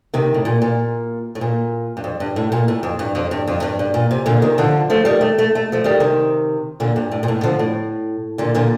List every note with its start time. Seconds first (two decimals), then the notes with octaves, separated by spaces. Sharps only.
0.14 C3 D#3
0.34 A2
0.45 A#2
0.62 A#2
1.35 A2
1.41 A#2
1.97 G2
2.04 F2
2.20 G2
2.36 A2
2.52 A#2
2.68 A2
2.83 F2
2.99 G2
3.15 F2
3.31 G2
3.47 F2
3.62 G2
3.79 G2
3.94 A#2
4.11 C3
4.26 A#2 D3
4.42 C3 D#3
4.58 D3 F3
4.90 F3 A3
5.05 D#3 G3
5.21 A3
5.38 A3
5.55 A3
5.72 F3 A3
5.84 D#3 G3
6.00 C3 D#3
6.80 A#2 D3
6.96 G2
7.11 A2
7.23 A#2
7.28 A2
7.43 D3 F3
7.59 A2
8.38 A#2 D3
8.55 A#2 D3